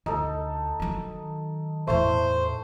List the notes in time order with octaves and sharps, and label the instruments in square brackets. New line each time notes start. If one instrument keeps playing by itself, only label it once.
[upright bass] D2 [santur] D#4 A4
[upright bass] D#3 F#3
[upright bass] E2 A2 [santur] A3 [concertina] C5